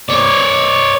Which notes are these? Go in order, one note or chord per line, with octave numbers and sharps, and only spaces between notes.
C#5 D5